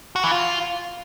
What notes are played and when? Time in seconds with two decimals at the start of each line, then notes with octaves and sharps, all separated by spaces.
0.16 F#4
0.24 E3
0.32 F4